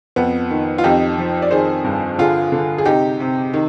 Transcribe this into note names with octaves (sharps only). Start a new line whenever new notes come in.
F2 B3
D#3
F4
F2 D#4 G4
F3
D5
D#3 G#4 C5
G2
D3 F4 G#4
D3
G#4
C3 D#4 G4
C3
D#3